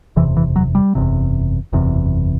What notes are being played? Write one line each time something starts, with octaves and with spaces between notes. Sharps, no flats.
F#1 E2 C3 E3
E3
F#3
G3
F#1 E2 C3
F#1 E2 C3